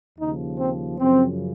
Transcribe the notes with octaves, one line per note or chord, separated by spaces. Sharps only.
D#2 C#3 F3 D#4
C4
F#2 C#3 F3 C4